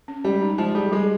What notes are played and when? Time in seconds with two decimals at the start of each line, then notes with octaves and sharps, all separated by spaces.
0.08 C#4
0.24 G3 G#3
0.42 D#4
0.58 F3 G#3
0.75 G3 G#4
0.92 G3 G#3